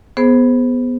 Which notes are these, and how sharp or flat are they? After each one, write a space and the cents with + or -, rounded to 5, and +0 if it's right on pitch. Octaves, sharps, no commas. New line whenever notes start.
B3 +0 G#4 +20 C5 +0